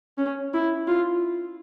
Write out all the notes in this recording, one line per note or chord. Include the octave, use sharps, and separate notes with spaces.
C#4
E4
F4